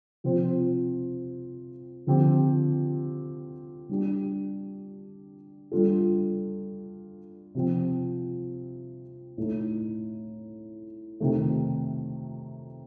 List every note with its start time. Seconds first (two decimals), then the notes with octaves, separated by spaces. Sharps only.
0.24 C3 F3 C4 F4 C5
2.07 D3 F3 C4 G4
3.89 G3 D4 G4
5.72 G3 D4 F4 A4
7.55 C3 F3 C4
9.38 A2 A3 D#4
11.20 C3 D#3 A3